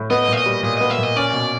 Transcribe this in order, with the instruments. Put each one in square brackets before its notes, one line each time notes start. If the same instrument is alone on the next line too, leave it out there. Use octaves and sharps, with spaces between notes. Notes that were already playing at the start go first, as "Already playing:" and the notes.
Already playing: [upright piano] A2
[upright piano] B3 [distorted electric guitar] D#5
[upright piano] A#2 [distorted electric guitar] E5
[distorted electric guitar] D#5
[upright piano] G3
[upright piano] A#2 [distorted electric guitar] D#5
[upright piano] B3 [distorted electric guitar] D#5
[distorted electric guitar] E5
[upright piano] A#2 [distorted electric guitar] D#5
[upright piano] C#4 [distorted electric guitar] D5
[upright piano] B2